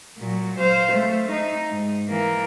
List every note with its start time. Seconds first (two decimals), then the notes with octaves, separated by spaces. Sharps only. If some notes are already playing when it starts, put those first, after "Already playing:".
0.18 A#2 F#3
0.59 C5 F5
0.92 A3
1.31 D#4
1.70 G#2
2.09 E3 A#3